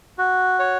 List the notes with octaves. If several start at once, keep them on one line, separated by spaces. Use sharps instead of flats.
F#4
C#5